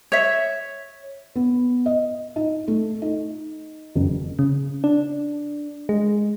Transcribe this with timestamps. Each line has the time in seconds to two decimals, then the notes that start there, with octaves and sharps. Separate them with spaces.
0.12 C#5 E5
1.35 B3
1.86 D#5
2.36 D#4
2.68 A3
3.02 D#4
3.95 F#1
4.39 C#3
4.84 D4
5.89 G#3